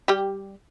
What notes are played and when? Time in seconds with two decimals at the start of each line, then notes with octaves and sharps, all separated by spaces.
0.08 G3 G4